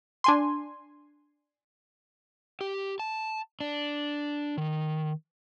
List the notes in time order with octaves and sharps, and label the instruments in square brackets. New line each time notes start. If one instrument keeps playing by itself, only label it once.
[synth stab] D4 G#5 C6
[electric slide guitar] G4
A5
D4
D#3